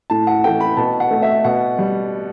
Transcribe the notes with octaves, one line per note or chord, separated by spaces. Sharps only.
A2 A5
F#5
E3 A3 G5
B5
B2 A5
F#5
A3
E5
B2 F#5
G3